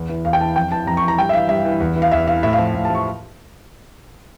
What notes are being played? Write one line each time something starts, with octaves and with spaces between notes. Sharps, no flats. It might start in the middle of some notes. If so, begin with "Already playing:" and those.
Already playing: E2
E3
E2 F5
G5
E3 A5
F2 G5
E3 A5
F2 A#5
C#6
E3
A#5
G2 G5
E5
E3 F5
G2 E5
E3
E2
E3
F5
E2 E5
E3 F5
A2 E5
F5
F3
A2
A5
F3 C#6